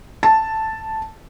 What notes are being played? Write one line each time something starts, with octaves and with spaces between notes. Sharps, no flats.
A5